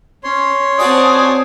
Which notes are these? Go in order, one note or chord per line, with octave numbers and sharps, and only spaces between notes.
C#4 C#5 C6
C4 F#4 D5 G#5 A5 D#6